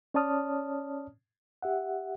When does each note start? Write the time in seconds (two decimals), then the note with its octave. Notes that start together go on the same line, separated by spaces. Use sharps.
0.14 C#4 C#5 D5 A5 D#6 F6
1.62 G4 E5 F#5